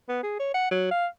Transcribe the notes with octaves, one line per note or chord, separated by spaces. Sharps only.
B3
G#4
C#5
F#5
F#3
F5